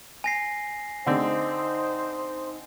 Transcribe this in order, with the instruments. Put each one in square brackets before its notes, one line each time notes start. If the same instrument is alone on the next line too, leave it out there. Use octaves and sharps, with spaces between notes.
[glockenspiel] G#5 A#6 C7
[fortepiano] D3 C4 [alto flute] D#4 [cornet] C5